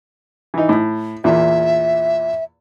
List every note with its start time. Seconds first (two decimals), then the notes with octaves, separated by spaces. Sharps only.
0.54 E3 D#4
0.69 A2
1.24 E2 A#2 E5